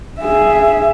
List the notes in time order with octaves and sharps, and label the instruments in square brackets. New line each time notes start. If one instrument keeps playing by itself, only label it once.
[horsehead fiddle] G#4 E5